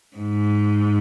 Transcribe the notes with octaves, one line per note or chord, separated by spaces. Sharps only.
G#2